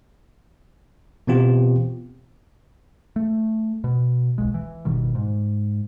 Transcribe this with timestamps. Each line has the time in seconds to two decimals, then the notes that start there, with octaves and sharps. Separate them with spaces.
1.27 B2 E3 B3 C4 F4 G4
3.16 A3
3.84 B2
4.38 D1 B1 G#3
4.54 E3
4.85 F#1 B2 D#3 G3
5.15 G#2